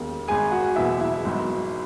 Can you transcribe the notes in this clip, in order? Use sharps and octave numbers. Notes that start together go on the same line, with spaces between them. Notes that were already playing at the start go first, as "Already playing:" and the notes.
Already playing: E1 D#2 D#3
G#1 G#2 D#3 G#4 G#5
F#4 F#5
F#1 E2 B2 F#3 E4 E5
E4 E5
G#1 G#2 F#3